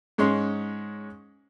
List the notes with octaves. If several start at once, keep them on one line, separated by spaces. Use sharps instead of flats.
G#2 G#3 C#4 C6